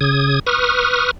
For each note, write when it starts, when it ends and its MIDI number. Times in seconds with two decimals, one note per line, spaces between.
0.01 0.39 49
0.01 0.39 87
0.01 0.39 92
0.47 1.11 71
0.47 1.11 85
0.47 1.11 87
0.47 1.11 89